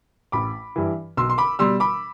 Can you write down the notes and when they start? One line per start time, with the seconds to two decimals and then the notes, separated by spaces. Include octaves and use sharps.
0.32 A1 B5 D6
0.76 G2 E3
1.17 B1 C6 E6
1.30 C6
1.38 B5 D6
1.59 B2 G3 C6 E6
1.80 B5 D6